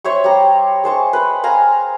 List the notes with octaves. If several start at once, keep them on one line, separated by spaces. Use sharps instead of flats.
C5 C#5 E5 C#6
G3 A#5
G#3 C5 A5 C#6
B4 C5
F5 G#5 A#5